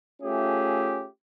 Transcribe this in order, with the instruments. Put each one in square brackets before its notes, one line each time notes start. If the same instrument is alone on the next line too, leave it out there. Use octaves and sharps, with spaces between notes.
[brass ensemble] A3 C#4 F4 G4 G#4 E5